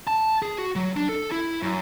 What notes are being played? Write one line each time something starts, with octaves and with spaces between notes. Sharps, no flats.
A5
G#4
F#4
F#3
D4
A4
E4
F#2